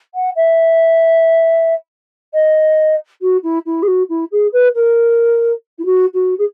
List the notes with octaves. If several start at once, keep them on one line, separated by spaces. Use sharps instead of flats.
F#5
E5
D#5
F#4
E4
E4
G#4
F#4
E4
G#4
B4
A#4
E4
F#4
F#4
G#4